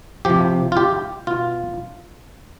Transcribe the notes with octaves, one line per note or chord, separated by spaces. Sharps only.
C3 F3 G4
F4
G4
B2 F4